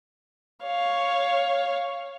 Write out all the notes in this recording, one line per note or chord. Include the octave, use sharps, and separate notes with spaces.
C#5 F5